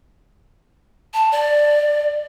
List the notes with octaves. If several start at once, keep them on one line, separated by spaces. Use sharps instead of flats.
A5
D5